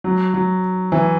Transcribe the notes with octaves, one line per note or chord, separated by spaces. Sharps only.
F#3
F#3
E3